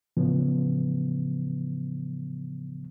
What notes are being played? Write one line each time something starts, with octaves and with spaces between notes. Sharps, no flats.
A2 C#3 E3 F3 B3